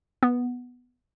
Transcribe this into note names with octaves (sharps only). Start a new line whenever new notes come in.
B3